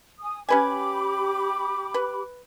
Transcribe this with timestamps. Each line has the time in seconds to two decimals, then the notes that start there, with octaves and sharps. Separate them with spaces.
0.20 G#5 D#6
0.49 C#4 G4 B4 G#5 B5 D6
1.94 B4